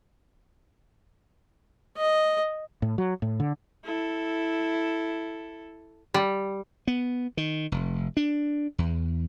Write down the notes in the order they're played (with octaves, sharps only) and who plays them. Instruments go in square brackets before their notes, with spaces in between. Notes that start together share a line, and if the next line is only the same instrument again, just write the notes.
[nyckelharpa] D#5
[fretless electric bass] A2
F#3
A2
D3
[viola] E4 A4
[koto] G3
[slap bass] B3
D#3
F1
D4
E2